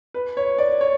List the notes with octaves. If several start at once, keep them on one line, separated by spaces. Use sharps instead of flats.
B4
C#5
D5
C#5